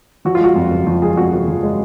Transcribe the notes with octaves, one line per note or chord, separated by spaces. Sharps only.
F3 F#4
F4
G#3 F#4
F2
F#1
F3 F#4
G#3 G#4
F2 F#4
F#1 F#4
F3
G#3